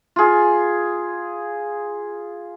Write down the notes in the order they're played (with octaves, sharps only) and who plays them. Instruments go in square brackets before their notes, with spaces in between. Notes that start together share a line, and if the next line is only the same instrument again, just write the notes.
[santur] F4 G#4